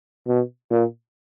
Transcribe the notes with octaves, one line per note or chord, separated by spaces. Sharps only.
B2
A#2